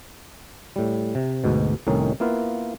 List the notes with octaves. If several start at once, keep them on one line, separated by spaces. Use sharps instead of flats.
A2 G3
C3
D2 G#2 B2
C2 A2 D#3 C#4 D#4
A#3 B3 E4 F4 B4 F5